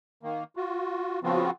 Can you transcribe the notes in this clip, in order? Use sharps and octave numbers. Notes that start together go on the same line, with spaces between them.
D#3 A#3
F4 F#4
C#3 F3 B3 C4 F4 F#4